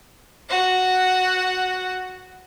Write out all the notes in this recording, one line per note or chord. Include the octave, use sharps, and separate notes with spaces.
F#4 F#5